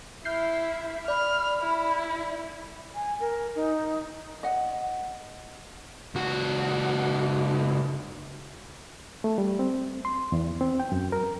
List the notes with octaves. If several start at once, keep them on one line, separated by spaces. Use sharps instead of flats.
E4 E5 F6 G6 C7
D5 B5 F6
E4
G#5
A#4
D#4
D#5 F#5
C#2 F#4
A3
G3
C4
C6
E2
C4
G5
F#2
A#4